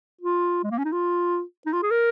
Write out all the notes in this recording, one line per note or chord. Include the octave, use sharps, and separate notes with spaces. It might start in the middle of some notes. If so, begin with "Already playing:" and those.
F4
G#3
A#3
C#4
D#4
F4
D#4
F4
G#4
A#4